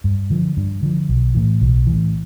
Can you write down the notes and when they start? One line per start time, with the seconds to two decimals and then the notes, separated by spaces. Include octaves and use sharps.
0.04 G2
0.30 D3 F3
0.57 G2
0.82 D3 F3
1.09 B1
1.35 A2 E3
1.61 B1
1.87 A2 E3